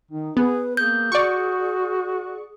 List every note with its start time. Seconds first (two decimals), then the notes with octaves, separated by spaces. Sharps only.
0.11 D#3 D#4
0.37 B3 G#4 B4
0.77 A#3 G#4 G6
1.12 F#4 D5 C#6